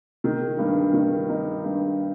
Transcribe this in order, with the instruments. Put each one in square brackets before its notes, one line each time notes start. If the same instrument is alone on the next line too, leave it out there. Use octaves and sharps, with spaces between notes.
[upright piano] D#3
G2
D#3
D#4
G2